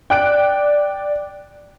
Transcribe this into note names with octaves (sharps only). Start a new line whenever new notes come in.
D5 G5 F#6 D7